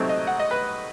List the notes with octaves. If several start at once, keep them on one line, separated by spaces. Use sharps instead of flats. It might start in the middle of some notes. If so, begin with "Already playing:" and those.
Already playing: C3 F#3 A3 C4 D#4
D#5
F#5
D#5
B4